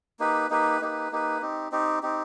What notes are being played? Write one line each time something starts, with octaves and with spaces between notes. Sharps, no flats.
A#3 D#4 G4 B4
A#3 D#4 G4 B4
A#3 D#4 G4 B4
A#3 D#4 G4 B4
C4 D#4 G4
C4 D#4 G4
C4 D#4 G4